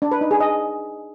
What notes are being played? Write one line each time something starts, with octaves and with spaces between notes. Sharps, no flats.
D4
B4
D#4
G#4
D#5